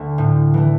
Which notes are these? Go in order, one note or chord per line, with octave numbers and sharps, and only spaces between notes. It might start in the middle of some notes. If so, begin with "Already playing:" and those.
Already playing: D2 D3 A3
A2
E3 A3